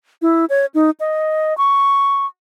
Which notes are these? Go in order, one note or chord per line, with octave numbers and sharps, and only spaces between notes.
E4
C#5
D#4
D#5
C#6